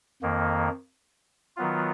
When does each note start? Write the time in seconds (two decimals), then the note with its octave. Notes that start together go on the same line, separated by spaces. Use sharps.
0.22 F2 D#3 A#3
1.57 D#3 F#3 B3 F4